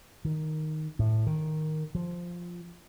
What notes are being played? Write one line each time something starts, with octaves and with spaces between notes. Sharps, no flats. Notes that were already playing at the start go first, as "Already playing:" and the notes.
D#3
A2
D#3
F3